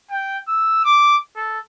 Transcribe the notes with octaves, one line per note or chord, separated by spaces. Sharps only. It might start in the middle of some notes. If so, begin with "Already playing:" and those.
G5
E6
D6
A4